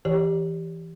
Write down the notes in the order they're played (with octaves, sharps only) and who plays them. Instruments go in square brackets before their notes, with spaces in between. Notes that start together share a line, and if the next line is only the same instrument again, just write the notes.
[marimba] E3 G4 C#5